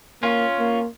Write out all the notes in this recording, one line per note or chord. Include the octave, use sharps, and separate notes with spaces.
A#3 C#4 F4
A#3